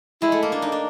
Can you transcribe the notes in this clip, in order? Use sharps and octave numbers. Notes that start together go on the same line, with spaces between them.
G#3 E4
A3
A#3
D4
D#4
D4